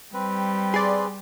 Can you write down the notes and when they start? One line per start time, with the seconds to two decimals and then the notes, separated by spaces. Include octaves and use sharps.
0.14 G3 C4 B4
0.74 G#4 D5 C6